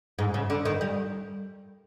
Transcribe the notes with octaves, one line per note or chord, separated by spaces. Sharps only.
G#2
C#3
D3
D#3
G3